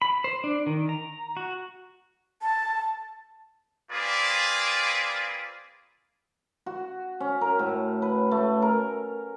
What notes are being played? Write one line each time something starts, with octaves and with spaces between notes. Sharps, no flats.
B5
C5
D4
D#3
A#5
F#4
A5
A#3 C4 F4 G#4 B4 D5
F#4
C#4
A#4
A2
B4
A3
A#4